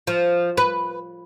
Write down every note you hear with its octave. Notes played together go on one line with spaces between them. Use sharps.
F3
B4